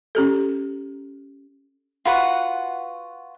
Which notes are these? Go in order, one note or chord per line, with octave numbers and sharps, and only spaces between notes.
C#4 G4 A4
F4 F#4 B4 F#5